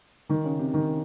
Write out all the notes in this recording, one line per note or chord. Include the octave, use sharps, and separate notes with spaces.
D#3
C#3
C3
D#3